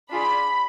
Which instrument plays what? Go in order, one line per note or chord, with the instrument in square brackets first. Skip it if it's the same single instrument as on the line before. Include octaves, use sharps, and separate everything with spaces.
[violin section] D4 F4 G#4 B5